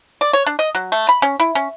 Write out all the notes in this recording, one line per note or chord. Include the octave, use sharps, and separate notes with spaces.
D5
C#5
D4
D#5
F#3
A3
B5
C#4
E4
C#4